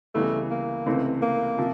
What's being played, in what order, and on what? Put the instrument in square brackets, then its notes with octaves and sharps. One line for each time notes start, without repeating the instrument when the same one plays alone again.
[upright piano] C#2 C#3 E3 G3 B3 [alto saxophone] A3
[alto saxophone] A#3
[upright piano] C#2 C3 E3 A3 C4
[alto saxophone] A#3
[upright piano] C3 F3